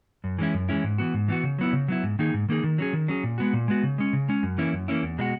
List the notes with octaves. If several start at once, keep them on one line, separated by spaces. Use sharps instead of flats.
F#2
E3 G#3 C#4 E4
F#2
E3 G#3 C#4 E4
G#2
E3 B3 F#4
G#2
E3 B3 F#4
C#3
F#3 B3 E4
C#3
F#3 B3 E4
G#2
D#3 A#3 D#4 G#4
G#2
D#3 A#3 D#4 G#4
D#3
F#3 C#4 G#4
D#3
F#3 C#4 G#4
A#2
G#3 B3 F#4
A#2
G#3 B3 F#4
C#3
G#3 C#4
C#3
G#3 C#4
F#2
E3 A#3 C#4 E4
F#2
E3 A#3 C#4 E4
E2
B2 G#3 D#4 F#4